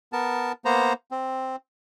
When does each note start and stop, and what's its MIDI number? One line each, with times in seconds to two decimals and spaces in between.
0.13 0.52 59
0.13 0.52 70
0.13 0.52 81
0.65 0.93 58
0.65 0.93 59
0.65 0.93 72
0.65 0.93 82
1.11 1.56 60